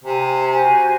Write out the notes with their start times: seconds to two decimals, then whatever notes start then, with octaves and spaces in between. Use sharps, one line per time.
0.04 C3 G#5 A#5
0.50 F#4 C5 G#5